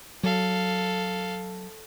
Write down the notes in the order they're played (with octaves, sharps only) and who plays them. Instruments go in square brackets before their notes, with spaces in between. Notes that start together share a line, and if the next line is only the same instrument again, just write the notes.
[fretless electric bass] F#3 [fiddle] A4 F5